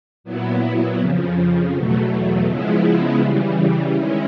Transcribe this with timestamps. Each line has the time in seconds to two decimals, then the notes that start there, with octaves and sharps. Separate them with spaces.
0.24 A#2 F#3 B3 E4
0.98 F2 C#3 F3
1.73 E2 B2 F#3 A3
2.46 C#3 F3 G#3 B3 E4
3.21 C#3 E3 G3
3.94 D#3 G#3 C#4 E4